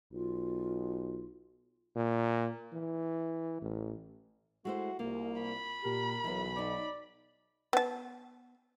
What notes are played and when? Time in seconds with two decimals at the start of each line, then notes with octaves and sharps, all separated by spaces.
0.13 B1 F4
1.96 A#2
2.73 E3
3.61 A1
4.65 G#3 A3 E4 F#4 C5
4.99 C2 A#3 F4
5.41 B5
5.84 A#2 G4 A#4
6.24 B1 E3 B3
6.56 D#4 C#5 D5
7.73 B3 A5